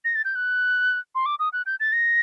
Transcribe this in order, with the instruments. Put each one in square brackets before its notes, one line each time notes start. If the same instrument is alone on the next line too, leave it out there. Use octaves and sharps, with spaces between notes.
[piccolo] A#6
A6
G6
F#6
C6
D6
D#6
F#6
G6
A6
A#6